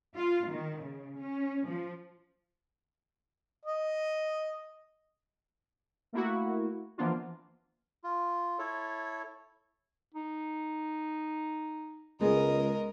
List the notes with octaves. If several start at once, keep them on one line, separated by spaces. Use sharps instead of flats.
F4
D#3
C#3
C#4
F3
D#5
A3 A#3 E4 F#4
E3 F3 A#3 B3 D4 F4
F4
E4 A4 C#5
D#4
C#2 G#3 B3 G#4 A#4 D#5